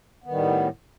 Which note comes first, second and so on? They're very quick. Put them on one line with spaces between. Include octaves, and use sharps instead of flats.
B3 D#3 G3 A2